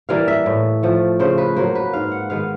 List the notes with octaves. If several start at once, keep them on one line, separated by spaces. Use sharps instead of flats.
E3 G3 A#3 F5
E5
A2
F3 A3
C#3 C5
B4
F#3 A#3 C5
B4
G#2 F5
F#5
D#3 G#3 B3 F5